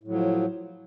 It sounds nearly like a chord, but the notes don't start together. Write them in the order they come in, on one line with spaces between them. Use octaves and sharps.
A2 F#3 F3